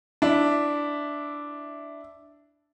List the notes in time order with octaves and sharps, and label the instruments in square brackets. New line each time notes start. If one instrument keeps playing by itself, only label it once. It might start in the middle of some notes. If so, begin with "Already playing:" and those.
[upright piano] D4 E4